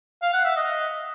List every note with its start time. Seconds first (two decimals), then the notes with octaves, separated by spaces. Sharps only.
0.22 F5
0.33 F#5
0.45 E5
0.56 D#5